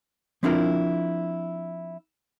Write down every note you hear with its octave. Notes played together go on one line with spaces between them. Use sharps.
F3 C4 D4 E4 F4 A#4